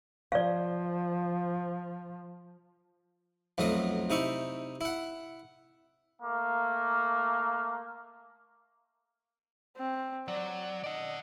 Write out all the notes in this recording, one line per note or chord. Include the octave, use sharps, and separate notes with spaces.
F3 D5 F5
B1 F2 F#3 A3 D#5
C3 D#4 E4 C#6
E4 F#5
A3 A#3
C4
F#3 D5
D5 D#5 F#5